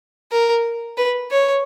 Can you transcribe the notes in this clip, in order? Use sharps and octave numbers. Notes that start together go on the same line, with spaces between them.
A#4
B4
C#5